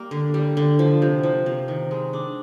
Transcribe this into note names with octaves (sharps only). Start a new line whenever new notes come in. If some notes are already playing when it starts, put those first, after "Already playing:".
Already playing: G3 A#3
D3
G3
D3
F3
C3
F3
C3
D#3
G#3
D4